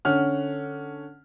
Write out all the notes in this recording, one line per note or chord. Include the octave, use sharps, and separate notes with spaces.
D3 C#4 F#5 F6